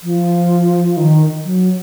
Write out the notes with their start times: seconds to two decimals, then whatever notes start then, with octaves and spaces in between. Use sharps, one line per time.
0.03 F3
0.97 D#3
1.44 F#3